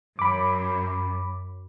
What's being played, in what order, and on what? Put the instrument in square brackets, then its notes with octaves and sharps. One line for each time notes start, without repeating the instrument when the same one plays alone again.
[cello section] F#2 [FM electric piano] B5 D6